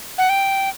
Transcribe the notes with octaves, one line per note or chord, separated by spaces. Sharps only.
F#5
G5